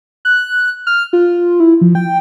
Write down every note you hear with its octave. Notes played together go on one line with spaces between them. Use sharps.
F#6
F6
F4
E4
F3
G5